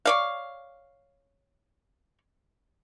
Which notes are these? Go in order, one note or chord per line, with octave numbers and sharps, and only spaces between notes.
C#5 D5 F5